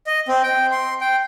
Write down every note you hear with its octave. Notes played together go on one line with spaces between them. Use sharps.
D#5
C4
G5
C6
G5